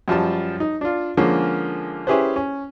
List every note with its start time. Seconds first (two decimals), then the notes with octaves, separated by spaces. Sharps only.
0.08 F#2 F3 G3 A5
0.60 D#4
0.81 D4 F4
1.17 D3 F3 G#3 A#3 C#4
2.07 C#4 E4 G4 G#4 B4 C5
2.36 C#4